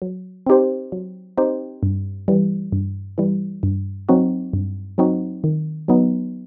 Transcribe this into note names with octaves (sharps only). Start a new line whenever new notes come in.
F#3
C4 D#4 G4 C5
F#3
C4 D#4 G4 C5
G2
E3 G3
G2
E3 G3
G2
F#3 C4 D#4 F#4
G2
F#3 C4 D#4 F#4
D#3
F#3 B3 D#4